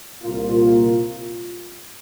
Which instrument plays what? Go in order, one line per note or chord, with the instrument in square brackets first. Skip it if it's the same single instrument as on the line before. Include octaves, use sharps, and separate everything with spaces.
[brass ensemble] C2 A#2 A#3 F4